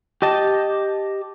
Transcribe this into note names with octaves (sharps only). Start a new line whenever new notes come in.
G4 D#5 A5